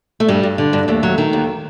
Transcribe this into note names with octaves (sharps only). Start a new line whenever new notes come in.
A3
G2 G3
G2
D3
G2
D#2 A3
F#3
D#3
D#2